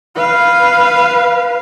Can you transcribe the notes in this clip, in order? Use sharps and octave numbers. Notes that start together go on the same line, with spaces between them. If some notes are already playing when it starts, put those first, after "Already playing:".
B4 F5